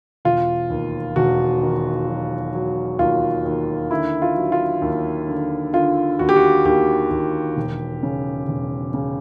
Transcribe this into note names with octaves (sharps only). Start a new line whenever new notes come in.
E1 F4
D#2
E1 F#4
D#3
F#3
F#3
D#2 F4
D#2
D3 E4
F4
F#3
F4
D#2
D3
D3 F4
D#2 F#4
G4
F#4
D#2 G4
D#2
E1
C#3
E1
C#3